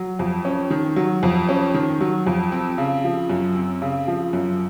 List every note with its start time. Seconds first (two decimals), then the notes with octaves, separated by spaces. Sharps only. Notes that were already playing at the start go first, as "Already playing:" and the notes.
Already playing: F#3
0.19 F2
0.45 C#4
0.70 D#3
0.96 F#3
1.23 F2
1.49 C#4
1.74 D#3
2.01 F#3
2.27 F2
2.52 C4
2.78 C#3
3.04 F3
3.29 F#2
3.56 C4
3.82 C#3
4.07 F3
4.33 F#2